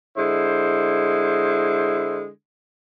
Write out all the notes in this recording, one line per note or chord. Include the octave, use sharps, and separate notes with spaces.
D3 G#3 E4 C5